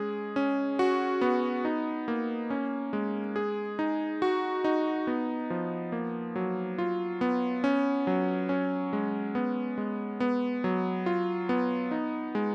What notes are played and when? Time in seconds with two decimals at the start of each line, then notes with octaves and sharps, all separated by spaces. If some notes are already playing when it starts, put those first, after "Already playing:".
Already playing: G#3 C#4 G#4
0.36 C#4
0.79 F#4
1.21 B3
1.65 D#4
2.08 A#3
2.50 C#4
2.93 G#3
3.36 G#4
3.79 D#4
4.22 F#4
4.64 D#4
5.07 B3
5.50 F3
5.92 A#3
6.36 F#3
6.78 F4
7.21 B3
7.64 C#4
8.07 F#3
8.49 C#4
8.93 G#3
9.35 B3
9.78 G#3
10.20 B3
10.64 F#3
11.06 F4
11.49 B3
11.91 D#4
12.35 G#3